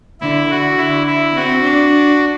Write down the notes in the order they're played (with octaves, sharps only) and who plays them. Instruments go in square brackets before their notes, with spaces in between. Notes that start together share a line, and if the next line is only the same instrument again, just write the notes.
[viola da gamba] D3 [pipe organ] E4
[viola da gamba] D3 [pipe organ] F#4
[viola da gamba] D3 [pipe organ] E4
[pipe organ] E4
[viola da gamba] C4 [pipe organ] F#4
[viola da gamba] D4